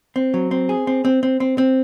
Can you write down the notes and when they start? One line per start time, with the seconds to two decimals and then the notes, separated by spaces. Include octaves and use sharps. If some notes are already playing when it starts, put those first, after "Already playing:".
0.16 C4
0.34 F#3
0.51 C4
0.69 G#4
0.87 C4
1.05 C4
1.23 C4
1.40 C4
1.58 C4